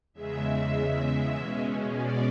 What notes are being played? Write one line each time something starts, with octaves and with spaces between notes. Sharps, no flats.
E2 C#3 G#3 E5
B2 G#3 C#4
D5